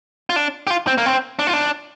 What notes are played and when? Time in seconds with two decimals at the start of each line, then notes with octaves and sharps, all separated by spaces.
0.30 F4
0.36 D4
0.67 G4
0.70 F4
0.87 C4
0.98 A#3
1.06 C4
1.39 D4
1.47 F4
1.53 D4